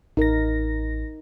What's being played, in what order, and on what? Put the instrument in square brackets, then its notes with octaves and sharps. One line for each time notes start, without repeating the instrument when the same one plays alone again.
[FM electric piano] A1 A#6 [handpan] D#4 A#4